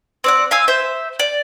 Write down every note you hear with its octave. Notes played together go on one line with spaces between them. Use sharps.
C4 D5 F#5
F5 G#5 E6
C5 E5 G6
D5